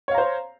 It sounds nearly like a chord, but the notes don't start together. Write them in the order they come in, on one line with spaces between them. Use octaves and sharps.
C#5 F5 A#5 C5